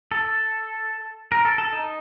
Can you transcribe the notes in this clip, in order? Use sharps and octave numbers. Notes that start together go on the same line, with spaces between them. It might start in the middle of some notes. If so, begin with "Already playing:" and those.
A4
A#4
A4
A4
D#4